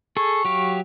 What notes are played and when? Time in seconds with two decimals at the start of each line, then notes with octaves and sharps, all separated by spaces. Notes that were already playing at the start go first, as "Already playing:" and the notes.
0.17 G#4 A4 C#6
0.45 F#3 G4 F5